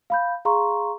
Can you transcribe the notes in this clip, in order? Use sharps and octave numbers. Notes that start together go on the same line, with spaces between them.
F5 B5 G6
G#4 F5 A#5 C6 C#6